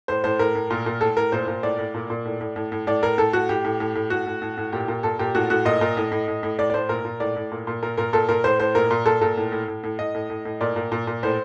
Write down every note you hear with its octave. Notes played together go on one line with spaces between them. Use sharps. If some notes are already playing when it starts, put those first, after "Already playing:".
A2 C5
A2 C5
A2 A#4
A2
A#2
A#2
A2 A4
A2 A#4
A#2 C5
A#2
A2 D5
A2
A#2
A#2
A2
A2
A2
A2
A2 D5
A2 A#4
A2 A4
A2 F#4
A2 G4
A2
A2
A2
A2 F#4
A2
A2
A2
A#2 G4
A#2
A#2 A4
A#2 G4
A2 F#4
A2 F#4
A#2 D#5
A#2
A2
A2
A2
A2
A2 D5
D5
A2 C5
A#2 A#4
A#2
A2 D5
A2
A#2
A#2
A#2 A#4
A#2 A#4
A#2 A4
A#2 A#4
A2 C5
A2 C5
A#2 A#4
A#2
A#2 A4
A#2 A4
A2
A2
A2
A2
A2 D#5
A2
A2
A2
A#2 D5
A#2
A#2
A#2
A2 C5